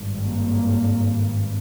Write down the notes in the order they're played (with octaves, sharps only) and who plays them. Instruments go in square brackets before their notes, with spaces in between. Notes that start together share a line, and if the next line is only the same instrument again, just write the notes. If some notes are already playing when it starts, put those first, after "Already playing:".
Already playing: [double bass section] G#1 G2
A#3